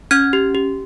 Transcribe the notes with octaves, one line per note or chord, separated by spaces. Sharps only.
C#4 F6 G#6
G4
G4